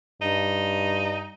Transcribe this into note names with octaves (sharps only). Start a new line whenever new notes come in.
G2 D#4